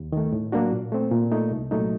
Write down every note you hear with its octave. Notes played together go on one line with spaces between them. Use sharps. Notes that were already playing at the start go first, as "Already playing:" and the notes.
Already playing: D#2
D#3 A3
A2
F#3 A#3 D4 F#4
A#2
A3 C4
A#2
A3 D#4
C2
A#2 F#3 A3 D#4